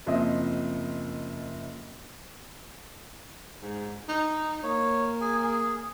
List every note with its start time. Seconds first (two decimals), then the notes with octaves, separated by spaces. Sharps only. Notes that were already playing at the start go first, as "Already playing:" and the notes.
0.06 F#1 F3 C4 D#5 E5 D#6
3.62 G#2
4.09 D#4
4.63 A#3 C#5
5.21 G#4 G#5
5.43 G#4